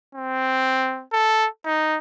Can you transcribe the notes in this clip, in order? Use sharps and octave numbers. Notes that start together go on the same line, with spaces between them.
C4
A4
D#4